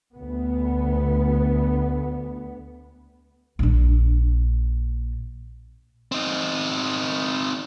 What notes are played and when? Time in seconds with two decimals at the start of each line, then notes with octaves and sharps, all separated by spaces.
0.17 D2 B3
3.59 A#1 D4
6.12 C4 D#4